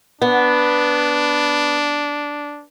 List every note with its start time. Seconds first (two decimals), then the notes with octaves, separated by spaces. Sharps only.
0.22 B3 D4